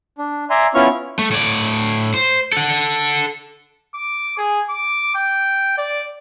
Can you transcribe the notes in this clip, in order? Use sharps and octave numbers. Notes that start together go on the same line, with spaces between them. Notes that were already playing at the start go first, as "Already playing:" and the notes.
D4
D5 E5 G#5 A#5 C6
B3 C#4 E4 F4 C#6 F6
A3
A2 D5
C5
A4 F#5
D6
G#4
D6
G5
D5